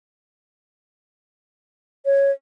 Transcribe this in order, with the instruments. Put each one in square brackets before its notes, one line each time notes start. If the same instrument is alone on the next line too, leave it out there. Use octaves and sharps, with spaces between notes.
[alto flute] C#5